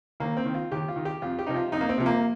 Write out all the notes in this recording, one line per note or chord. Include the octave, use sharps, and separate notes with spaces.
D#2 A#3
C4
D#3
F4
D#2 G4
F4
D#3
G4
F2 F4
G4
C3 F3 D#4
F4
F2 D#4
A#3
C4
C3 F3
A#3